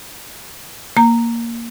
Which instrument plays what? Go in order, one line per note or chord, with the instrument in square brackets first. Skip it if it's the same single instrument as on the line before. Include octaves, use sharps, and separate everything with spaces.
[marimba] A#3 A#5